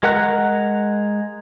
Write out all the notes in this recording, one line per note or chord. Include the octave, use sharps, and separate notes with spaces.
G#3 A#4 F#5 A#5 F#6